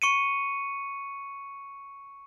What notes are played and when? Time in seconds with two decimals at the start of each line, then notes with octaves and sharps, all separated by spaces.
0.02 C#6 C#7 D#7